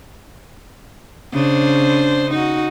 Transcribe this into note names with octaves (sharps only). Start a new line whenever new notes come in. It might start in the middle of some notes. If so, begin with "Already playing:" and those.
C#3 D4 C5
D#4 F#4